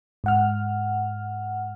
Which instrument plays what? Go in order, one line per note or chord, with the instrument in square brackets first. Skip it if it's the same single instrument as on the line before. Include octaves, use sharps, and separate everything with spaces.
[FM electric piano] G#2 F#5 F6